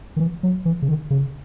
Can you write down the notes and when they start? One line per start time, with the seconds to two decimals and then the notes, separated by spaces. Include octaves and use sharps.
0.16 D#3
0.20 E3
0.43 F#3
0.65 E3
0.82 C#3
0.88 D#3
1.10 C#3